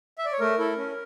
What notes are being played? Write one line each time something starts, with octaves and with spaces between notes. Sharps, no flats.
E5
D5
C#5
A3 A#4
E4 A4
C#4